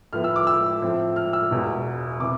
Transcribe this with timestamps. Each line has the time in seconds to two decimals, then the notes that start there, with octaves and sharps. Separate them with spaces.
0.13 A2 F3 B3 F6
0.24 E6
0.36 D6
0.47 E6
0.82 A2 F3 C4
1.16 F6
1.33 E6
1.51 E1 E2 B2
2.20 C3 E3 D6